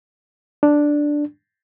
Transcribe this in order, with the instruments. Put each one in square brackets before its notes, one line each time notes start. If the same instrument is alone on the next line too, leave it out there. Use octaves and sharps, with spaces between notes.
[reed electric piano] D4